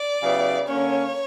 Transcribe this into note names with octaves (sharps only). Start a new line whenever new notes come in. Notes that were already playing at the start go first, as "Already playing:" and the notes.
Already playing: D5
C#3 F#3 B3 E4 G4
D3 A#3 C#4 C#5